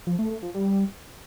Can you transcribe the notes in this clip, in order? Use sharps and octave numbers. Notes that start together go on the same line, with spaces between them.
F3
A3
A3
F3
G3